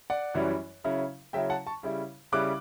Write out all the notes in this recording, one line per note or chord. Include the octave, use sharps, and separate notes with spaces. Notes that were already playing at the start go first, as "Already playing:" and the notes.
D5 F#5
F#2 E3 G3 C#4 E4
C#3 F#3 C#4 E4
C#3 F#3 C#4 E4 E5 G5
F#5 A5
A5 C#6
C#3 G3 C#4 E4
C#3 G3 C#4 E4 D6 F#6